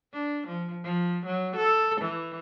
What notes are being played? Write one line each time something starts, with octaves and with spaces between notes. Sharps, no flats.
D4
F3
F3
F#3
A4
E3